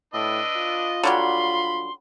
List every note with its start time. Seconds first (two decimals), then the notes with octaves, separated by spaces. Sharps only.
0.14 A2 D4 B4 D#5 E6
0.57 F4
1.03 D3 F#3 G3 B5 C6